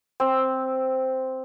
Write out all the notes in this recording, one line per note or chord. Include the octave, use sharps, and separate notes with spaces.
C4